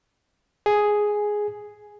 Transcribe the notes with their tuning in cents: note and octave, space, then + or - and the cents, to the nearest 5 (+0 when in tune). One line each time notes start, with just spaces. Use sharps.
G#4 +5